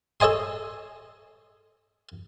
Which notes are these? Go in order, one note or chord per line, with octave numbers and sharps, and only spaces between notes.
A4 C#5 D#5 G#5 C6